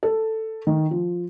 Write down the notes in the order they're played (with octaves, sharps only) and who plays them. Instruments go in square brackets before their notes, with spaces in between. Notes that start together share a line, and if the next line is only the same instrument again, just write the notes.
[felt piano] A4
D#3
F3